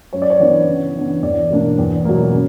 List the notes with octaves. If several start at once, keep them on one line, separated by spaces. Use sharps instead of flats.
F#2 C#5
D5
C#5
E3 B3 D4
C#3
E3 B3 D4
E2 D5
B2 A#3 D4
E2
B2 F#3 A#3
C#3